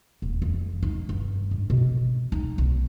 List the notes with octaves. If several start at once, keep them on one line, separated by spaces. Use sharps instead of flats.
D#1
F2
D#4
G2
G#2
B2
D#4
B1